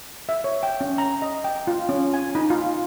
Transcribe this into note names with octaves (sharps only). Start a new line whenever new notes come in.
E5
C#5
G5
C#4
A#5
D#5
G5
F4
C#4
G#5
D#4
F4